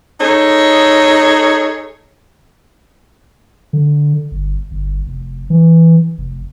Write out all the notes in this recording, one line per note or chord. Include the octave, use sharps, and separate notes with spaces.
D#4 G#4 A4 C#5
D3
G1
G1
F1
E3
F1